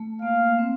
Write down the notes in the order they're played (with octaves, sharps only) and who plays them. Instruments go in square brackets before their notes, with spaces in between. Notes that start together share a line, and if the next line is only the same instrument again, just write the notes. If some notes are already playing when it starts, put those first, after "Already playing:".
Already playing: [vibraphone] A3
[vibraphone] A#3 [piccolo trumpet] F5
[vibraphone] C4